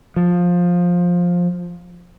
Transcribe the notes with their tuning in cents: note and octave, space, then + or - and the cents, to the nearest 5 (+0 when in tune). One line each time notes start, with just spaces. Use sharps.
F3 +15